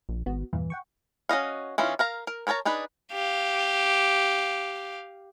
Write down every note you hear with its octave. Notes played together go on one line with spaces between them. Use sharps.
A#1
G#1 B3 F#4
E2 G2 A#2 E3
F#5 G5 C#6
C#4 F#4 D#5 F5
E3 C#4 D#4 F4
A#4 F5 A#5
A#4
D4 A#4 C#5 A5 A#5
D4 D#4 G#4 B4
G4 F5